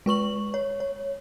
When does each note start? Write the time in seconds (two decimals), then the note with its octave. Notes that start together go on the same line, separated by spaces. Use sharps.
0.06 G#3 B4 C#6 F#7
0.54 C#5
0.80 C#5